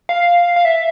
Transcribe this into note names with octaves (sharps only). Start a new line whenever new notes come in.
F5
F5
E5